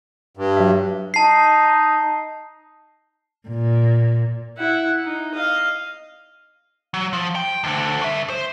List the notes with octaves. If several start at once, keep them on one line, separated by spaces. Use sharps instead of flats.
G2
F#3 E5
D#4 A5 C7
A#2
E4 F#5
D#4
D#5 F5
F#3
F3
G5
D2 D3
C#3 E5
C5